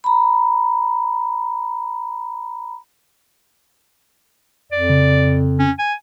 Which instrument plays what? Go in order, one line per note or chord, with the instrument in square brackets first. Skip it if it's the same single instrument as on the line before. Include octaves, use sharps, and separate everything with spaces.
[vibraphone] A#5 B5
[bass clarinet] F2 [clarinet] D5
[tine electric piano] C#3
[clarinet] C#4
G#5